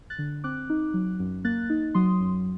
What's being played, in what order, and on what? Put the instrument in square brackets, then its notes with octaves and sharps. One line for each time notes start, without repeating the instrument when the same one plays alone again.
[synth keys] F#6 A6
D3
C4 D6 F#6
D#4
F#3
F#2
A#3 F#6 A6
D#4
F#3 C6 D#6
F#2